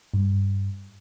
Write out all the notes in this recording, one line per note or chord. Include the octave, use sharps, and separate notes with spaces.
G2